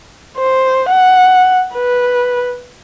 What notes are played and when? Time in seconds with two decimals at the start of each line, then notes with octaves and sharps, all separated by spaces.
0.37 C5
0.89 F#5
1.75 B4